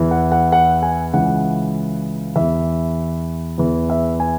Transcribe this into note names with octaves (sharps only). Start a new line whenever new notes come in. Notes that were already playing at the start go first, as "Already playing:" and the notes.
Already playing: E2 E3
F#5
F#5
F#5
G#5
C#2 C#3 E3 F#5
E2 E3 E5
E2 E3
E5
G#5